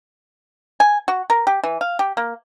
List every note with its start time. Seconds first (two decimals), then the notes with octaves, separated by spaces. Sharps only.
0.80 G#5
1.08 F#4
1.30 A#4
1.47 G4
1.64 E3
1.81 F5
1.99 G4
2.17 A#3